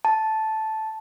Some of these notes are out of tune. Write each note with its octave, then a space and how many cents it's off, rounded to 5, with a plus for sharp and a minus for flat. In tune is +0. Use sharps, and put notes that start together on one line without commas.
A5 -5